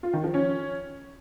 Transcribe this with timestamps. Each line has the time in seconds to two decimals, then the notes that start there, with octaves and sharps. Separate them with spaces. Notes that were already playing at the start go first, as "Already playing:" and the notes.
0.03 F4
0.13 D#3
0.24 F3
0.34 C#4